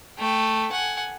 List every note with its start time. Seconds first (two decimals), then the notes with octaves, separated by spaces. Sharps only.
0.18 A3 G5
0.72 F#5 G#5